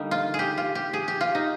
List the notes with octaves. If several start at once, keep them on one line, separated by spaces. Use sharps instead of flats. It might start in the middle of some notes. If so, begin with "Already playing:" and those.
Already playing: D3 G3 A#3 D#4
F4
G#4
G4
F4
G4
G#4
G4
F4
D#4